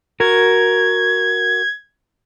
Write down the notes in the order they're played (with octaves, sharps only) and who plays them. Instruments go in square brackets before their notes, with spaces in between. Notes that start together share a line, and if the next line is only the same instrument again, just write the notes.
[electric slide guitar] F#4 A#4 [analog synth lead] G#6